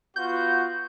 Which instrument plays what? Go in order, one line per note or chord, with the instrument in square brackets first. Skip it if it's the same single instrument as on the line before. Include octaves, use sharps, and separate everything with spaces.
[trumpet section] B3 F4 F#4 [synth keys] G6